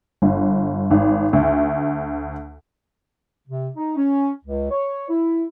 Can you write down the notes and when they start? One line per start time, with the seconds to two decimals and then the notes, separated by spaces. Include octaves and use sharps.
0.22 G1
0.91 G#1
1.33 D2
3.48 C3
3.76 D#4
3.97 C#4
4.45 C#2
4.71 C#5
5.09 E4